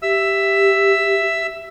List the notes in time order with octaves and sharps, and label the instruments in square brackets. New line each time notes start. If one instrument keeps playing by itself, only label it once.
[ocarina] G4 [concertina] E5 E6